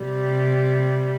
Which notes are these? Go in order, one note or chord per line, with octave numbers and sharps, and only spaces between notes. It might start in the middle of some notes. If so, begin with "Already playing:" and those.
Already playing: C3 G3